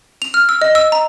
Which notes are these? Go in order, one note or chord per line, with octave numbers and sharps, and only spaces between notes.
F7
F6
E6
D#5
E6
A#5